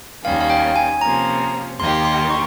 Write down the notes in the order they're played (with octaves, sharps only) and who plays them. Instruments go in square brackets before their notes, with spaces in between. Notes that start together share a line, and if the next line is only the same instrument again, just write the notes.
[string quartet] D#2 D#3 G3 C#4 [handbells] F5
[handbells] F5
G5
G#5
[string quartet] C3 F3 A#3 C#4 [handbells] A#5
[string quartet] D#2 D#3 A#3 D#4 G4 [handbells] C6
[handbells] C6
C#6